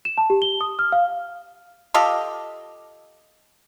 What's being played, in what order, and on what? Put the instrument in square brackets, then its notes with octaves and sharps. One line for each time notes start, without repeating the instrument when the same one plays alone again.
[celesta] E7
A5
G4
G7
D#6
F6
F5
[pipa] F4 G4 A4 D#5